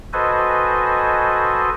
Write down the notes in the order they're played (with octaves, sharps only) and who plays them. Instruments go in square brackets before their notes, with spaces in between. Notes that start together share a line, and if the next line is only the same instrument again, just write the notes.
[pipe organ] F#4 A4 B4 C5 D#5 G#5